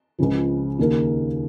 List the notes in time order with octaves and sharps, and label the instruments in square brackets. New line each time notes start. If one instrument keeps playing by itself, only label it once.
[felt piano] C#2 C#3 F3
D#2 C#3 A#3 D#4 A#4